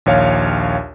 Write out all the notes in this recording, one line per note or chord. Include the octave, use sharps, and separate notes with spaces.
A#1 D#2 C#5 F5